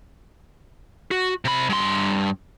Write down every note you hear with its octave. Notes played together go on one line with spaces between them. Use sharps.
F#4
C3 B5
G2 C6